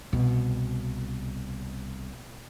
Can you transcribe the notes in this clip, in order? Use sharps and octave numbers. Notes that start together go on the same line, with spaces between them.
C2 B2